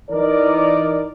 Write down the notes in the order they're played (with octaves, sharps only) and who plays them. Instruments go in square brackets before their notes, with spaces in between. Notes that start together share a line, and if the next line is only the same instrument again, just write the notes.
[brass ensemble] E3 D#4 A#4 D5